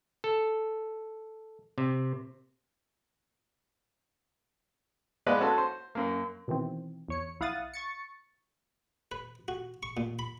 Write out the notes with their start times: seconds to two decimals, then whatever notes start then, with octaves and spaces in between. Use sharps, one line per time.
0.24 A4
1.78 C3
5.26 G#3 B3 B4 D5 D#5 F5
5.40 C#4 F#4 A4 A5 C6
5.58 C5
5.95 F#2 A#3
6.48 B2 D#3 E3 C4
7.08 E2 C#5 C#7
7.40 B1 E4 F5 F#5 D#6 A6
7.74 C#6 A6 C#7
9.12 B4
9.48 F#4
9.83 C#6
9.97 A#2
10.19 B5